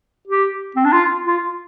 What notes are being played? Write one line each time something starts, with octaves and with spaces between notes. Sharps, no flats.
G4
C4
D4
F4
F4